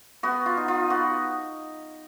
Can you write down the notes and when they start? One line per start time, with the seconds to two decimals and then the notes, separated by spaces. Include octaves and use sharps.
0.23 B3 F#4
0.46 F4
0.57 D#4
0.68 F4
0.90 B3 F#4